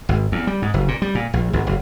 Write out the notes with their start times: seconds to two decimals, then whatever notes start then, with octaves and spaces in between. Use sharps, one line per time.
0.09 G#1
0.32 E2
0.47 G3
0.62 G#2
0.74 F#1
0.88 A#2
1.02 G3
1.15 A#2
1.33 A#1
1.53 G#1
1.67 F#1